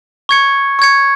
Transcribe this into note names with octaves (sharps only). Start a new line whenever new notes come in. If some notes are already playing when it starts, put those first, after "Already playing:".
C#6 G#6 C#7
C#6 G#6 C#7